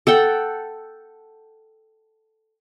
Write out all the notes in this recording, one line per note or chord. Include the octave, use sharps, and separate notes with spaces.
A4 F#5 G5